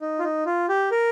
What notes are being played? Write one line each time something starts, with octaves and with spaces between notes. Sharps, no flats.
D#4
F4
D#4
F4
G4
A#4